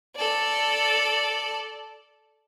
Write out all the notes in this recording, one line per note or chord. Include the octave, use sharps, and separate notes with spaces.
A4 D5